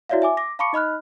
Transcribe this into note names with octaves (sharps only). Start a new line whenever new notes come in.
E4 F#4 C#5 D5 E5 F5
E5 G#5 D6
D6 A#6
F5 A5 B5 C#6 D6 C#7
D#4 D#5 B5 F6 F#6